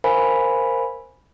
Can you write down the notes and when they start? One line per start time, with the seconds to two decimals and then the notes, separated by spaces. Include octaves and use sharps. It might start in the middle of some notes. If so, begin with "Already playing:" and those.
0.04 A#4 C5 F5 G#5 B5